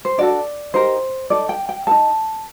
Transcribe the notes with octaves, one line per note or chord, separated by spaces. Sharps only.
C5
D4 F#4 A4 D5
D#4 G4 A#4 C5
D#4 A4 D5
G5
G5
D#4 A4 A5